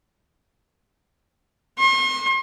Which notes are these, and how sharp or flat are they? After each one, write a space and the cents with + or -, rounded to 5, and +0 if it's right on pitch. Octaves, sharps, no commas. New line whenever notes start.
C6 +45